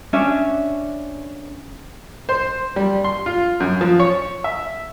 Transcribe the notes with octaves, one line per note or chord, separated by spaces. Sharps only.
C#4 D4 E5
C5
G3
C6
F4
F#2
F3
C#5
E5